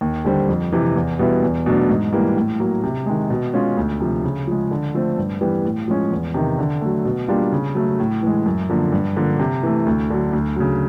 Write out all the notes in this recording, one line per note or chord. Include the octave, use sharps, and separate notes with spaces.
D#2
D3 G3 C4
F2
C3 E3
E2
B2 G3 B3 E4
E2
B2 F#3 A3 D4
G#2
E3 G3 A#3
A2
F#3 A#3
C3
D#3 G#3
B2
G#3 C#4 F4
D2
C3 F3
C#3
F3 G#3
D3
F3 A3 C4
G2
E3 G3 B3
A2
F3 G#3 C#4
E2
C3 D#3
D3
F#3 A3
B2
G3 A#3 D4 F4
C#3
F#3 A3
A2
E3 G#3
F#2
D3 F3 A#3
G2
D3 F3 A#3 D4
C3
E3 A3
D2
D3 F#3
D2
C#3 F#3